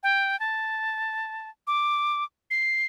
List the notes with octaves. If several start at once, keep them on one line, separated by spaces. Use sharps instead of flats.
G5
A5
D6
C7